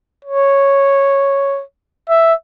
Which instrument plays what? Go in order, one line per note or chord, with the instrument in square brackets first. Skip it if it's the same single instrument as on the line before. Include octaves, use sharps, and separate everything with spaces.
[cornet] C#5
E5